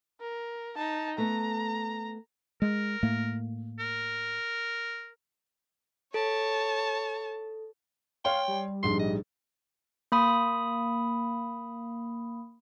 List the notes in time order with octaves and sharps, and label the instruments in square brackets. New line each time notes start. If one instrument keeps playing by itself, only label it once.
[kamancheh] A#4
D#4 A5
[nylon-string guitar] A3 B3 [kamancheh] A#5
[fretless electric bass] G#3 [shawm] A#4
[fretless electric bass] A2 A3 A#3
[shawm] A#4
[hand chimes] A4 [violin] C#5 A5
[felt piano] C#5 C6 [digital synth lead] F5 [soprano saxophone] G5
[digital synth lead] G3
[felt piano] A#1 G#2 [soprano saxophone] C6
[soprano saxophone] D#5
[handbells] A#3 B5 D#6